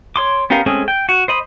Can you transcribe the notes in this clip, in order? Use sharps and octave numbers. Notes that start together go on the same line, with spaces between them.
C#5 C6 D6
B3 C#4 G4 A#4 F5
G#3 A3 C4 C#4 G#4
G5
F#4
C5 D#5 B5